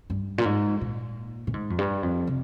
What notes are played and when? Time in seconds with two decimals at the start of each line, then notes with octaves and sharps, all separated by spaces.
0.10 G2
0.38 A#2
0.45 G#2
0.81 A#2
1.47 A#2
1.54 G#2
1.70 F2
1.78 G2
2.03 F2
2.27 C3